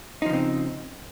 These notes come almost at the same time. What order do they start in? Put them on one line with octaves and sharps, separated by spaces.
D#4 F3 C#3 C4